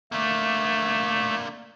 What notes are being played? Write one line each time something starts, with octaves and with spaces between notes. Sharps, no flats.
D3 A3 A#3